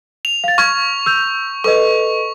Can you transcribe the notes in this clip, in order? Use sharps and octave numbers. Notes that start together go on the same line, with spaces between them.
F7
F5 A6
C#6 F6 G#6
E6 G6 F7
A4 B4 D#5 C#6